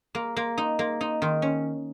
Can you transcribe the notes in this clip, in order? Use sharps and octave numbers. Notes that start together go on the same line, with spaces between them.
A#3
A#3
D#4
A#3
D#4
D#3
C#4